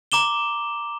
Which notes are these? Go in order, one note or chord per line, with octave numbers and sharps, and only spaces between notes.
A#5 D6 E7 G7